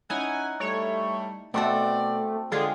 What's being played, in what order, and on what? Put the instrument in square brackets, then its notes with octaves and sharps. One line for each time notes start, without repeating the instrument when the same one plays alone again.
[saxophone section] C#4 F#5 [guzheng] D#4 E4 A#5 [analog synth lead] G#5
[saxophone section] G3 A3 [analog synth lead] C#5
[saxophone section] B2 D5 [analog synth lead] A3 [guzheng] C4 F#4 A4
[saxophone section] D3 [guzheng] G#3 F4 G4 [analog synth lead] G#4